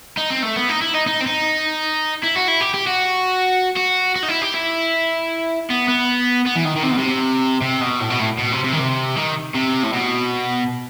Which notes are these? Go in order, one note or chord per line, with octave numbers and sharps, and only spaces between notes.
D#4
C4
A3
B3
D#4
E4
D#4
D#4
C4
D#4
E4
F#4
E4
G4
G4
F#4
F#4
F#4
D#4
E4
G4
E4
B3
B3
B3
E3
D#3
D#3
C3
B2
C3
C3
B2
A2
B2
A2
B2
C3
C3
D#3
C3
D#3
C3
A2
B2